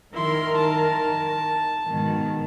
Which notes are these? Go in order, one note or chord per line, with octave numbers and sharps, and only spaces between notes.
D#3 E4 A#4 C6
A5
G#2 B2 D#3